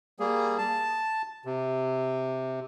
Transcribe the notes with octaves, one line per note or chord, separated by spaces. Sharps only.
G3 A#3 G#4
A5
C3